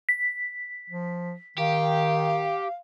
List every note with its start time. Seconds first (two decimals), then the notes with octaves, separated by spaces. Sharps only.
0.09 B6
0.90 F3
1.58 D#3 G4 F5